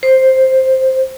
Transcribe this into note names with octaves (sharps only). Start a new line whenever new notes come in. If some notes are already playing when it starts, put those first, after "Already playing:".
C5